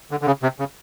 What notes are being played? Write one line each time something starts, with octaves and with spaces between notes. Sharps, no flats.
D3
D3
C#3
C3
C#3